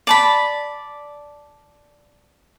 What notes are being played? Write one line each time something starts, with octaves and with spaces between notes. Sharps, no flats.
D5 A5 B5